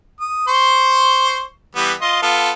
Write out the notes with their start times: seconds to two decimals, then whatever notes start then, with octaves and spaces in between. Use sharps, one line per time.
0.20 D#6
0.48 C5 C6 C#6
1.75 E3 G3 B3
2.01 F4 D#5 C6
2.22 B3 F4 A4